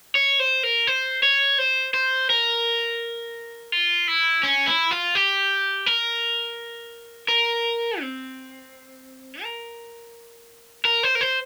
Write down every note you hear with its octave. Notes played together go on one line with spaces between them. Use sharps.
C#5
C5
A#4
C5
C#5
C5
C5
A#4
F4
E4
C#4
E4
F4
G4
A#4
A#4
C4
A#4
A#4
C5
A#4
C5